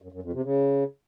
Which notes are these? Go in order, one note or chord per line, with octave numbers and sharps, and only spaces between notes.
F#2
F#2
F2
C3
C#3